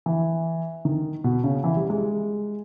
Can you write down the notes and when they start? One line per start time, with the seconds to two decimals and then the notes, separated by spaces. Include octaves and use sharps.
0.06 E3
0.85 D#3
1.24 B2
1.44 C#3
1.64 E3
1.77 G3
1.90 G#3